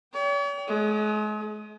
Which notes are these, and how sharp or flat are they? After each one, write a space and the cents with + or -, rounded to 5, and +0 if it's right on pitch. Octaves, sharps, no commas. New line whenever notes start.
C#5 +45 G5 +0
G#3 +40 D#6 +5